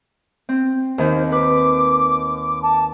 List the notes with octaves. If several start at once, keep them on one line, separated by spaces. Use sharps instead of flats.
C4
D#2 D#3 C5
B4 D6
A5